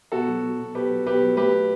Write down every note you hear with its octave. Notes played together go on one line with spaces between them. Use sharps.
B2 F#4 A4
F#3
F#3
B2
B2 G4 B4
F#3
B2 G4 B4
F#3
A3 G4 B4